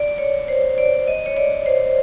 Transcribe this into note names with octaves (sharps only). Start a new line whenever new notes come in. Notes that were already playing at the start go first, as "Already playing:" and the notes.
Already playing: D5
C#5
C5
D5
D#5
C#5
D5
C5